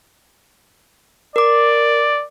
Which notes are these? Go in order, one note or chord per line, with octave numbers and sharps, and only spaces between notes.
A#4 D5 D6